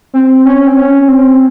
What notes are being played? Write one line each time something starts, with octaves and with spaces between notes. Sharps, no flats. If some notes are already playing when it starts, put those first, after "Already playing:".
C4
C#4
C4
C#4
C4